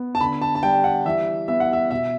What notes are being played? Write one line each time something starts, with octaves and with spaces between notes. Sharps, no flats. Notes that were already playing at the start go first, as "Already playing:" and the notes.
Already playing: B3
A5
D3 B5
A5
A5
G3 G5
F#5
E3 E5
B3 E5
F#5
E5
B2 E5